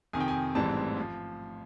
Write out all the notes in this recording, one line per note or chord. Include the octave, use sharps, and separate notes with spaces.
F2 C3 D#3 G#5
G5
G#5
A1 G#2 E3 G3 C4 A5
F3